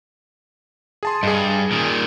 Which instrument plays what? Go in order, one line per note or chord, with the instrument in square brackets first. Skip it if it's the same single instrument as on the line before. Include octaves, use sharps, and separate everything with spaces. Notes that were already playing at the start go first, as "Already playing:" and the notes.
[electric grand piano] G#4 A5 C6
[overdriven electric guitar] G2 [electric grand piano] G#4 D#5
[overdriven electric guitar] A#2 D#3